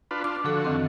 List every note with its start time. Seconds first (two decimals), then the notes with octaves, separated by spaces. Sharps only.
0.11 D4 F4 B4
0.24 D4 F4 D6
0.44 D3 F3 F#4 A4
0.65 F#2 D#3 C4